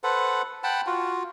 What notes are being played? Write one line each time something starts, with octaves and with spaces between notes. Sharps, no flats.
A4 B4 C5 F#5
F#5 G5 A5 B5
F4 F#4